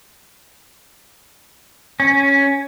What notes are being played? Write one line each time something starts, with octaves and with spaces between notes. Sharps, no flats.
C#4